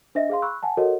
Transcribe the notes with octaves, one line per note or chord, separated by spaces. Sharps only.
D4 C5 D#5 E5 A#6
G#4 F5 C6
B5 C#6 E6 F#6
F#5 G#5 A5
F#4 A4 A#4 C#5 D#5 F#5